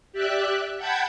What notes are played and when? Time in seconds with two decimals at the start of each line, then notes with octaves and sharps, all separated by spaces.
0.13 G4 D5 E5 F#6
0.78 F#5 G5 A5 B5 G6 G#6